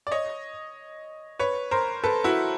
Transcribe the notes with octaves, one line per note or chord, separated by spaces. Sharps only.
D5
C#5 D#5
B4 C#5
A#4 C5
A4 B4
E4 F#4